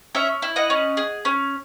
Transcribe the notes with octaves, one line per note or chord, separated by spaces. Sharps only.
C#4 C#5 E5
E4
D#5 F#5
C#4
G#4
C#4